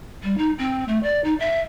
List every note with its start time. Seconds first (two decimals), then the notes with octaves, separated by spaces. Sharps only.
0.23 G3
0.37 D#4
0.58 C4
0.88 A3
1.03 D5
1.24 D#4
1.40 E5